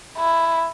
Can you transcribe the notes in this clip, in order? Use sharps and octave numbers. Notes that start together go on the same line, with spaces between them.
E4